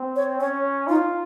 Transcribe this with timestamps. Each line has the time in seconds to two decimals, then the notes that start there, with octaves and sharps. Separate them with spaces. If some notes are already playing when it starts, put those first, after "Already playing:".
Already playing: C4
0.16 C#5
0.40 C#4 C#5
0.87 D#4 F4